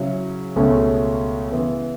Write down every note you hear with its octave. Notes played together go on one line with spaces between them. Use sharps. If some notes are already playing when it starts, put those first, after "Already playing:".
Already playing: C#3 F#3 C#4 E4
C#2 B2 A3 C#4
C#3 E3 B3